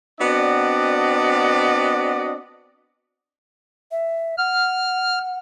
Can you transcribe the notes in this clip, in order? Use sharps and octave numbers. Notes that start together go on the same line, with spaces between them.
B3 C4 D4 F#4 D5 D#5
E5
F#5 F6